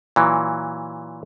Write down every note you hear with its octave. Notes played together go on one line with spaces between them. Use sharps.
A#2 E3 F#3